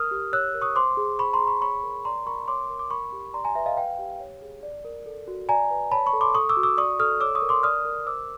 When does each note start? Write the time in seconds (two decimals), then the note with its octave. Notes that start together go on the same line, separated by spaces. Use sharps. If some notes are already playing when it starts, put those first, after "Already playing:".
Already playing: A#4 D#6 F6
0.11 G4
0.33 C#5 E6 F#6
0.55 A#4
0.62 C#6 D#6
0.76 C5 C6 D6
0.97 G#4
1.19 C5 B5 C#6
1.33 A#5 C6
1.41 G#4
1.47 B5 C#6
1.61 C#5 B5 C#6
1.83 A#4
2.05 D5 A#5 C6
2.27 A#4 B5 C#6
2.48 C#5 C6 D6
2.70 A#4
2.79 D6
2.90 A#4 B5 C#6
3.12 G4
3.34 D5 A#5 C6
3.45 G#5 A#5
3.55 B4 E5
3.66 D#5 F5
3.77 B4 F5 G5
3.99 G4
4.20 C#5
4.42 G#4
4.63 D5
4.85 A#4
5.06 A4
5.28 F#4
5.49 D5 G#5 A#5
5.70 B4
5.92 C#5 A5 B5
6.06 B5 C#6
6.13 A4
6.21 C6 D6
6.35 A4 C#6 D#6
6.49 D6 E6
6.57 F#4
6.63 D6 E6
6.77 D5 C#6 D#6
6.99 A4 D#6 F6
7.20 C#5 D6 E6
7.35 C#6 D#6
7.42 A#4
7.49 C6 D6
7.63 D5 D#6 F6
7.85 A#4
8.07 C5 D6 E6